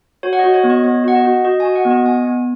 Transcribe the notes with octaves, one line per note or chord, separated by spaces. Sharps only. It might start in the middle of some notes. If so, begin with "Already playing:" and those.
F#4 C#5
F#5
D#5
F#4
C#5
B3
D#5
B3 C#5
F#4 F#5
D#5
F#4
F#4 D#5
G#5
F#4
F#5
B3
D#5
B3 G#5
B3